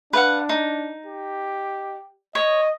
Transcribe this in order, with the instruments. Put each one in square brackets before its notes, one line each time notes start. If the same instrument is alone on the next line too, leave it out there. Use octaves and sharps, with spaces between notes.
[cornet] D4 [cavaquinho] B4 F5 F#5
[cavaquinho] D#4
[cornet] G4
[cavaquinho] C#5 [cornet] D#5